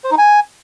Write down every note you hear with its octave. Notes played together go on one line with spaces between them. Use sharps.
C5
D#4
G#5